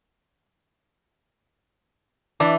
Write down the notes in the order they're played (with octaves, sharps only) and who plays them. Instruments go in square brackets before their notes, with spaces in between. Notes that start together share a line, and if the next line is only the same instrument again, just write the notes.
[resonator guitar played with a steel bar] E3 [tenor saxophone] D4